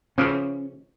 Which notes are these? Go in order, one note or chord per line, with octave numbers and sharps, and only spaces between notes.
C#3 E3 F3 C#4